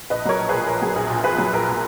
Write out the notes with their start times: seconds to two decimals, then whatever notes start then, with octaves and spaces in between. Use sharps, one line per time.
0.10 A#1 B4 D#5
0.25 F#3 A#4 C#5
0.39 A#1
0.49 A#2 G#4 B4
0.68 A#1 A#4
0.82 F#3 G#4
0.96 A#1 G#4
1.10 A#2
1.24 A#1 G#4 B4
1.38 F#3
1.53 A#1 A#4
1.68 A#2